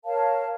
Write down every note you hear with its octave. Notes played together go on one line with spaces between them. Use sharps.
A#4 C#5 F5 A5